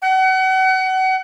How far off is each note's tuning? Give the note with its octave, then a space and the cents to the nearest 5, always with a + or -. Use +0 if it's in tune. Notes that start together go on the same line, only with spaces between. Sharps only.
F#5 +30